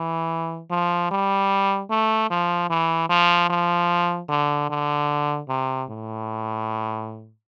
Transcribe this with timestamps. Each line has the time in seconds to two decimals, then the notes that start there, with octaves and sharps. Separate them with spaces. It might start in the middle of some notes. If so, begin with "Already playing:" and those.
Already playing: E3
0.70 F3
1.11 G3
1.90 A3
2.30 F3
2.70 E3
3.09 F3
3.50 F3
4.29 D3
4.70 D3
5.49 C3
5.90 A2